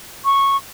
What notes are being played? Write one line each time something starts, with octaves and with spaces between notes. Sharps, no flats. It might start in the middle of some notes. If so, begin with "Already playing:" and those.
C#6